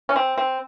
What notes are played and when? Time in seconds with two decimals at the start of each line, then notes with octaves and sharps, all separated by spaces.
0.09 C#4
0.16 C4
0.38 C4